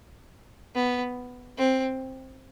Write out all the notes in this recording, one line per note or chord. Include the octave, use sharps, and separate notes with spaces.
B3
C4